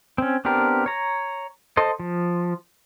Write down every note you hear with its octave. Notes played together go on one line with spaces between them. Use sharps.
C4 C#4
B3 C4 D4 G4 A#4
C#5 A#5
A4 C5 D#5
F3